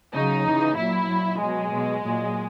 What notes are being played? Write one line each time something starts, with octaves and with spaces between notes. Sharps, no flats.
C#3 F#3 D#4
C#3 E3
A#2 F#3 E4
A#2 F#3
B2 F#3 G#3
B2 F#3
A#2 F#3